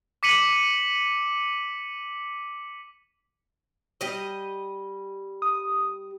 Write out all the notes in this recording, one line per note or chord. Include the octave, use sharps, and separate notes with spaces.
D6 B6 C#7 D#7 F#7
G3 D#5
D#6